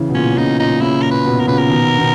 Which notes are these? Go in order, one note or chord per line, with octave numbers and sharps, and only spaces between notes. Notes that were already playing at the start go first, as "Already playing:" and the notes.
Already playing: C#3 E3
B2
A#2 C#3 C#4
B2
A#2 C#3 D#4
A#2 D#4
A#2 C#3 E4
A#2 A#4
B4
B2
B2 A#4
A#2 C#3 B4
A#4
B2 D#3
B2 D#3